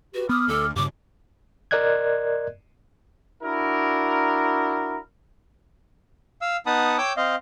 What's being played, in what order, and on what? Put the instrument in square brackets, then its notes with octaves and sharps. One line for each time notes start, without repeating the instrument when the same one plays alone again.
[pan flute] F#4 [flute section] G4 B4
[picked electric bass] B3 [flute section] D6 F6 [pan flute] D#6
[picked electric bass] D2 [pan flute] A4
[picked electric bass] G2 C#3 [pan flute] D6
[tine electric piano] A#4 D5 D#5 F#6 G#6
[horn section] D4 E4 F#4 A#4
[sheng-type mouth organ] F5 E6
B3 D#4 F#5 A5 B5 D#6
C#5 G5 D6 E6 G6
C4 D#5 F5